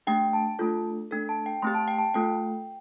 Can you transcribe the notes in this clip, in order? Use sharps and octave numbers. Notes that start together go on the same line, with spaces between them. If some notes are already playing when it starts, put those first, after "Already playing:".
A3 D4 G4 G5
A5
A3 D4 F4 A4
A3 D4 A4
A5
G5
A3 C4 G4 C6
A5
G5
A5
A3 C4 F4 A4 G5